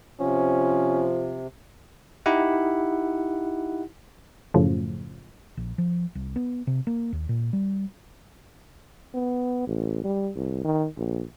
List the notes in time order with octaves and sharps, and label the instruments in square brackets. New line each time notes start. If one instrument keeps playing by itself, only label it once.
[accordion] C3 [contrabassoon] F3 [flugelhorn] C#4
[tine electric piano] D#4 E4 G4 F#5
[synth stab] F#2 A2 C#3 F3
[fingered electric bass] A#1
F3
C2
B3
C3
A#3
D#2
A#2
G3
[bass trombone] B3
A1
G3
C2
D#3
A#1